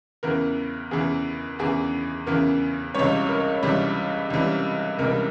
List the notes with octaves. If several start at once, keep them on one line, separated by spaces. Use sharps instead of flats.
E2 C#3 E3 A#4
E2 C#3 E3 G#4
E2 C#3 E3 G#4
E2 C#3 E3 A#4
C#2 C3 E3 G3 C#5
A#4
C#2 C3 E3 G3
C#2 C3 E3 G3
C#2 C3 E3 G3 A#4